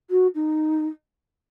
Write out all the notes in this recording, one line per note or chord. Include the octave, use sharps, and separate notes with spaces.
F#4
D#4